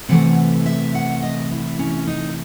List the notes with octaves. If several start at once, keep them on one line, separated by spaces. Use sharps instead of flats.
C3 E3 A3 F#5
E5
F#5
D#5
E4
C#4
D#4